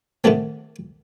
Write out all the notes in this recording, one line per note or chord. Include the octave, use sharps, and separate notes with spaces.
D3 D#3 G3 A3 C4